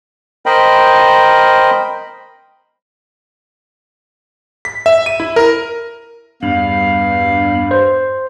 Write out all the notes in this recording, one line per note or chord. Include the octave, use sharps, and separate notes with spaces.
A#4 C5 D#5 G5 B5
B6
E5
D#7
E4
A#4
E2 G2 F5 B5
C5